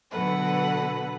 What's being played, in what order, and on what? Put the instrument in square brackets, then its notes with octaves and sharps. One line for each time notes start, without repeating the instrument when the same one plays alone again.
[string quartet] B2 D3 F#3 A4 B4 F#5